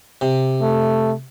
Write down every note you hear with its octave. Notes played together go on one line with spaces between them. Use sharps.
C3
A3